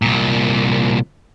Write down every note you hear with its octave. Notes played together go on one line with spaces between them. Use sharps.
C2 A#2